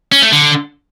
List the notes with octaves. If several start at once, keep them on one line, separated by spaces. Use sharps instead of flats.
C#4
A3
D3